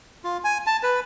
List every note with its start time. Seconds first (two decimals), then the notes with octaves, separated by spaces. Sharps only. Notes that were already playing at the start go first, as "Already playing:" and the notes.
0.24 F4
0.44 G#5
0.67 A5
0.83 B4